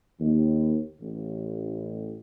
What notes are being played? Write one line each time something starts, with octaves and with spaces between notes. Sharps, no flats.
D#2
A1